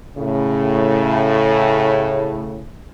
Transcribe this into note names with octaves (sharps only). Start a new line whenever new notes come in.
A2 C#3